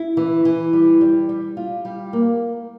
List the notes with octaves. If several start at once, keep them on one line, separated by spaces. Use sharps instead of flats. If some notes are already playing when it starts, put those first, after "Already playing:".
Already playing: E4
E3
E3
G3
G3
G3
F4
G3
A#3